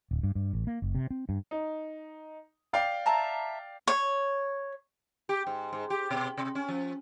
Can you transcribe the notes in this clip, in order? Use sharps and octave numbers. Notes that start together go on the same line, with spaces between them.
D1
G2
G2
A1
A#3
F#1
C3
C4
G2
D#4
D5 F5 G5
E5 A5 A#5
C#5
G4
G#2
G#2
G4
B2
C3
C#4
F3